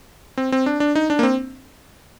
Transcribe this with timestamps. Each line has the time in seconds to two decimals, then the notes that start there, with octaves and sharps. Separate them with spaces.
0.37 C4
0.52 C4
0.66 D4
0.80 D4
0.95 D#4
1.10 D4
1.19 A#3
1.23 C4